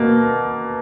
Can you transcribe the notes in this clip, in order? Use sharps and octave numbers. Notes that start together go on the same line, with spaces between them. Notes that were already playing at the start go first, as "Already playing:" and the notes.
Already playing: B2 A#3